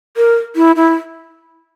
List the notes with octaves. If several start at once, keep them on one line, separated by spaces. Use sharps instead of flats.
A#4
E4
E4